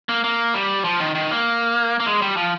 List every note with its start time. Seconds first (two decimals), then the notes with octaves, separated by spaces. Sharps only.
0.09 A#3
0.24 A#3
0.54 G3
0.84 F3
1.00 D#3
1.15 D#3
1.31 A#3
2.00 A#3
2.06 G#3
2.22 G3
2.37 F3